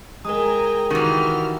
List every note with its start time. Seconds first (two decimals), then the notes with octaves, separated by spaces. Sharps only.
0.25 G#3 A#4 G5 G#5 A#5 D#6
0.90 D#3 E3 F#4 G4 F6